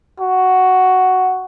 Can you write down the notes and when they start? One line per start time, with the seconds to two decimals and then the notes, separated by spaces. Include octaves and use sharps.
0.21 F#4